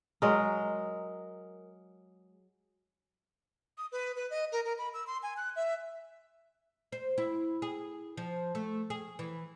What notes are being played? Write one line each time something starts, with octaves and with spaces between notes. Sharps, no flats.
F#3 G#3 A#4
D#6
B4
B4
D#5
A#4
A#4
B5
E6
C6
G#5
F#6
E5
C5
E4
G#4
F3
A3
G#4
E3